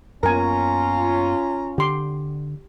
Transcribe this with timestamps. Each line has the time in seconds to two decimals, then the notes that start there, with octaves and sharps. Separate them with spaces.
0.23 F#2 A#3 B3 C#4 F4 A#4 G#5 A#5
1.78 D3 G4 C6 D6